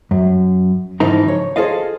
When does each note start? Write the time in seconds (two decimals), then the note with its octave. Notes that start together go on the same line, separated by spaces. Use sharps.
0.11 F#2
1.00 G#2 C#3 E3 F3 D#4 A#5
1.28 C#5
1.56 F4 G#4 A4 C5 D#5 F5